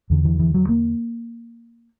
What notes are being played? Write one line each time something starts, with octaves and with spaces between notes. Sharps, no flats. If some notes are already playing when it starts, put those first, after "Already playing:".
E2 D3
E3
E3
F#3
A#3